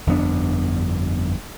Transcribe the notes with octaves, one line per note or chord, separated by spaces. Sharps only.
G1 F2 B3 D4